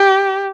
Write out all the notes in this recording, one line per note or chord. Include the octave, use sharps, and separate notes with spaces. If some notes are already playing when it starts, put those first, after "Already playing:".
Already playing: G4